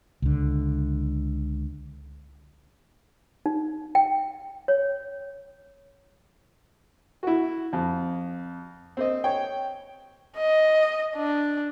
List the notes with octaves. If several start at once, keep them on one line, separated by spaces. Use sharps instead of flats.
C#2 D3
D#4
G5
C#5
E4 F#4
F2
C4 C5 D#5
C#5 G5
D#5
D4